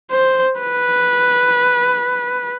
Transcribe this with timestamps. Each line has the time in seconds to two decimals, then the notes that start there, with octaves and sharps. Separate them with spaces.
0.11 C5
0.60 B4